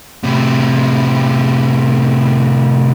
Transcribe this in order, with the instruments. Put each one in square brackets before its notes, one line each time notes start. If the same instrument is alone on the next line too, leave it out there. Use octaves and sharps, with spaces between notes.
[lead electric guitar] A2 C3